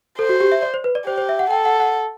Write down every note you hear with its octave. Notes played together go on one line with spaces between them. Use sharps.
A4 C5
F#4
G4
E5
D5
C5
B4
D5
G4 C5
C5
E5
F#5
A4 G5
F#5
F#5